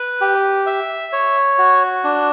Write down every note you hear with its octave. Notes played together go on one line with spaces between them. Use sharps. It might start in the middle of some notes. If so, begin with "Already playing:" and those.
Already playing: B4
G4
E5
C#5
F#4
D4